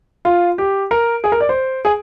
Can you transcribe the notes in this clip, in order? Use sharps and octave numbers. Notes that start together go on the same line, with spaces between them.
F4
G4
A#4
G#4
A#4
D5
C5
G#4